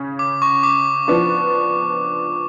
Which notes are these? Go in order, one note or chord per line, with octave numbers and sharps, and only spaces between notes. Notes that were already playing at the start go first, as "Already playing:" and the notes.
Already playing: C#3 C#4
D6
C#6
D6
F3 B3 D4